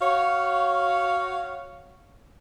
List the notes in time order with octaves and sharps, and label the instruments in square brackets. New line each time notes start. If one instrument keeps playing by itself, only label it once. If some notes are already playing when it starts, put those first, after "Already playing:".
[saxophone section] F#4 C#5 F5